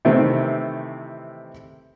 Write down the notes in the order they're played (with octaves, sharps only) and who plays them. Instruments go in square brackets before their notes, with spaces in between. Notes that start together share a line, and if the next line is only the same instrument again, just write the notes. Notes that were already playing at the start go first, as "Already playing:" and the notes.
[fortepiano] C3 D#3 E3 A3 C4